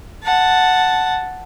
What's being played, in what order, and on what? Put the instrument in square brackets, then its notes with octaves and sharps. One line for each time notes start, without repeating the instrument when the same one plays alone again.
[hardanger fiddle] F#5 A5